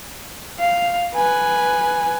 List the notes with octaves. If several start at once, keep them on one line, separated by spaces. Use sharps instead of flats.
F5
B4 G#5